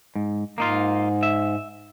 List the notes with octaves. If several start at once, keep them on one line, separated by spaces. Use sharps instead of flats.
G#2
G#2 A#3 D#4 F4
E5